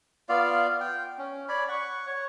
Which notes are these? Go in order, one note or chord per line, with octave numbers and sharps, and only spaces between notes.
B3 F4 D5 F5
G5
C#4
C#5 D5 B5
F#5 C#6
C#5